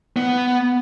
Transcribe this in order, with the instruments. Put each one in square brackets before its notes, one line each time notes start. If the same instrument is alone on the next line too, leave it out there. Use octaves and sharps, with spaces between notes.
[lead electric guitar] B3